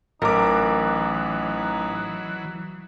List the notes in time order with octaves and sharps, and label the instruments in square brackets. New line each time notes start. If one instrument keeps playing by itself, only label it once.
[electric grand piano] A1 D6 [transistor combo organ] E3 F#3 [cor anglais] D#4 [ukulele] A#4